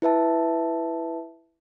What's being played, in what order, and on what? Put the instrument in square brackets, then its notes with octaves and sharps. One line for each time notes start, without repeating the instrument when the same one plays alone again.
[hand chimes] E4 B4 E5 A5